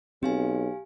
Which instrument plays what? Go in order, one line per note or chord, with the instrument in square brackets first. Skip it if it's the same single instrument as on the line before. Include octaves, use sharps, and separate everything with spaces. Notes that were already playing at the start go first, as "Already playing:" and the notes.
[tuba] B1 [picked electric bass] C4 [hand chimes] G4 F5 G#5